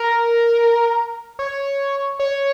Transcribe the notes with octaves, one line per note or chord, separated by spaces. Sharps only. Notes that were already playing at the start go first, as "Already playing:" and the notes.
Already playing: A#4
C#5
C#5